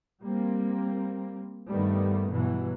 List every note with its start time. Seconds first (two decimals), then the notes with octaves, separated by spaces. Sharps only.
0.22 G3 A#3 C4
1.69 G2 D#3 G3 A3 B3
2.31 G2 B2 E3 F#3